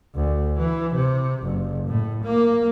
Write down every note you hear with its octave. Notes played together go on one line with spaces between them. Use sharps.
D2
E3
C3
F#1
A2
A#3